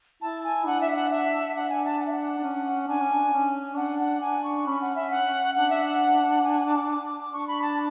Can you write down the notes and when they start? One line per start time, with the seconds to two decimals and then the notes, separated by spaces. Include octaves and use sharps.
0.22 E4 A5
0.44 G#5
0.66 D4 F#5
0.81 E5
0.92 E5
0.95 F#5
1.10 E5
1.55 D4 F#5
1.69 G#5
1.85 A5
1.99 F#5
2.07 E5
2.13 F#5
2.38 D4
2.44 C#4
2.88 D4 G#5
3.01 C#4
3.13 D4
3.33 C#4
3.77 D4 F#5
3.99 F#5
4.21 D4 G#5
4.44 C#6
4.66 C#4 B5
4.81 F#5
4.95 E5
5.11 F#5
5.55 D4 F#5
5.70 E5
5.84 F#5
6.44 G#5
6.66 D6
6.88 D6
7.32 D4 C#6
7.48 B5
7.62 A5